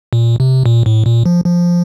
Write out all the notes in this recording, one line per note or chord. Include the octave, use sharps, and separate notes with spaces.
A#2
C3
A#2
A2
A#2
F3
F3